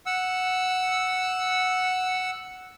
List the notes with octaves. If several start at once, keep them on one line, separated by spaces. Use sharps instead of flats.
F#5 E6